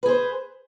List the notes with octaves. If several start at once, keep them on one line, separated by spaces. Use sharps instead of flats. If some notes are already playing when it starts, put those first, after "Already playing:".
G#4 B4 C5